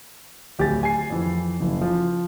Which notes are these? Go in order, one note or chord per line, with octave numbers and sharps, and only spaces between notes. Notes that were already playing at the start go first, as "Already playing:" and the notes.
D1 G4 G5 G#5 A6
G#5 C7
F2 E3
F#1 E3
F3